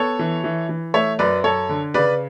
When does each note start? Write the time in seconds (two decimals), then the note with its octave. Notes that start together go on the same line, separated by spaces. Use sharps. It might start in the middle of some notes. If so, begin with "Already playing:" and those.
Already playing: B3 A4 C#5
0.19 E3
0.44 E3
0.69 E3
0.94 A3 C#5 E5
1.19 F#2 B4 D5
1.44 F#2 A4 C#5
1.69 D3
1.94 C#3 B4 D5